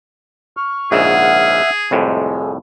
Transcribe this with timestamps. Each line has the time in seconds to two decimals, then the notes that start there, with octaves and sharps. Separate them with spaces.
0.57 C#6 F6
0.92 A#1 G#2 C#3 G#4 E5 F#5 F6
1.91 C2 F2 A2 G#3